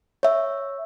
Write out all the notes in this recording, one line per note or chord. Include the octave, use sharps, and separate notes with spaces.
C#5 E5